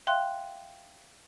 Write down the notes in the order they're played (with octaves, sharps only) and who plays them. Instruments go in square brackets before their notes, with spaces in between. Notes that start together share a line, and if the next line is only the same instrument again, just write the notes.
[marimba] E5 F5 G5 C6 F#6